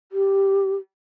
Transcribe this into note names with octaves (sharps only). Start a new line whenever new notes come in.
G4